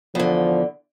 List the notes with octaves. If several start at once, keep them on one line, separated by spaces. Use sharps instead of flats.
E2 D3 F3